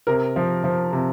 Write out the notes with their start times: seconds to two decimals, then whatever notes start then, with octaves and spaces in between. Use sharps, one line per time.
0.07 C3 A#4
0.36 F3
0.64 F3
0.93 C3